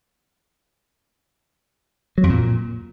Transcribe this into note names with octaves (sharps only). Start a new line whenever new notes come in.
F#3
F2
A#2